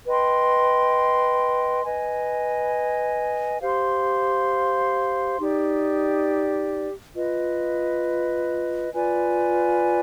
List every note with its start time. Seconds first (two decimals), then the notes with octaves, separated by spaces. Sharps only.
0.05 B4 D#5 G5 C6
1.83 B4 D#5 G#5
3.60 G4 C5 F5 C6
5.38 D#4 G4 D5
7.15 F4 B4 D#5
8.93 F4 B4 D5 G#5